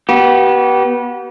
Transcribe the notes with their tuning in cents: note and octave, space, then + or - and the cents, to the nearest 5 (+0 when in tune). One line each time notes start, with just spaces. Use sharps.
B3 -25 G4 -40